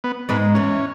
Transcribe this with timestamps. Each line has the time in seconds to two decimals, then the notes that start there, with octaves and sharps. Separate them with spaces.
0.04 B3
0.29 G#2 G#3 B3
0.54 E2 E3 C#4